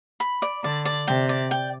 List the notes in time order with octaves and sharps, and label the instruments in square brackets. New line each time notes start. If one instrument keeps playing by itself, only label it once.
[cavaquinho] B5
D5
[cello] D3 [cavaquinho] D5
[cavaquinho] D5
[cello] C3 [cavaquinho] G5
[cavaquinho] D5
G5